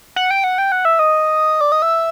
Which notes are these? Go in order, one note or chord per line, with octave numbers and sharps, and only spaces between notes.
F#5
G5
F#5
G5
F#5
E5
D#5
D5
D#5
E5